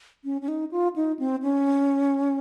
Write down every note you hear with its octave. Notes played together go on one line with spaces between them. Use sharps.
C#4
C#4
D#4
F4
D#4
C4
C#4